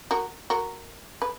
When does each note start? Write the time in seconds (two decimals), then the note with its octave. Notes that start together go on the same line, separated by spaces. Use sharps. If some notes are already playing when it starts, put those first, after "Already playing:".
0.11 F#4 A#4
0.50 F#4 A#4
1.22 B4